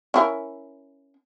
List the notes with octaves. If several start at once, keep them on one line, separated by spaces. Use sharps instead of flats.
C#4 E4 A#4